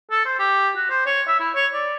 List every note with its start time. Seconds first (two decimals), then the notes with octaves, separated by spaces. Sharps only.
0.11 A4
0.25 C5
0.39 G4
0.76 F#4
0.90 C5
1.06 C#5
1.27 E5
1.40 E4
1.55 C#5
1.74 D5